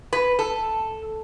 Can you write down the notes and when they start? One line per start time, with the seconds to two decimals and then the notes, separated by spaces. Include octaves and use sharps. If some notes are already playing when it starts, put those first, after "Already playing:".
0.13 B4
0.39 A4